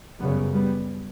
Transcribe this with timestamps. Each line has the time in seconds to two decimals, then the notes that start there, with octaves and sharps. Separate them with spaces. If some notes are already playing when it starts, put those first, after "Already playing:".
0.19 F#2 C#3 G3 B3
0.54 G3 B3